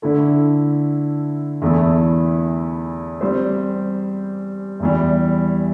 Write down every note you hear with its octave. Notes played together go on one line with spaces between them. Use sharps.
D3 A3 E4 A4
E2 E3 A3 E4 A4
G3 C4 G4 C5
E2 E3 G3